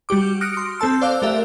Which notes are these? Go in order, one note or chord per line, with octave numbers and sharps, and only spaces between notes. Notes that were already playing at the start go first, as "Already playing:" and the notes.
G3 F#4 G4 D6
D#6 F6 F#6 A#6 C#7 D7
C6
C4 A4 A5 E6
C5 D5 F5 D6 E6 F#6
A3 G4 A#4 E5